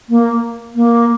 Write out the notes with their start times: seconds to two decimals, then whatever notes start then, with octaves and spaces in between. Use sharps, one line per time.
0.09 A#3
0.75 A#3